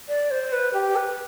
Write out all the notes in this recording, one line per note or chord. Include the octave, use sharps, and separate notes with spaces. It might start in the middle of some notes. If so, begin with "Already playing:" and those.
D5
C5
B4
G4
B4